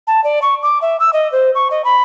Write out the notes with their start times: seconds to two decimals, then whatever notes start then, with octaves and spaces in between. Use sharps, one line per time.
0.07 A5
0.24 D5
0.42 C#6
0.63 D6
0.82 E5
1.00 E6
1.13 D#5
1.32 C5
1.55 C#6
1.71 D#5
1.85 B5